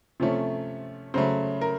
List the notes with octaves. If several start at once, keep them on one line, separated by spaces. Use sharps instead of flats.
C3 F3 A3 C#4
C#3 F#3 A3 C5
A#4